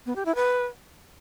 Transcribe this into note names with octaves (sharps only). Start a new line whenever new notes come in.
B3
G4
E4
B4